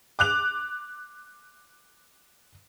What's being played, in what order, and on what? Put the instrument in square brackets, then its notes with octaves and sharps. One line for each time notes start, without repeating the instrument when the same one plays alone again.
[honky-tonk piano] D6 F#6 F7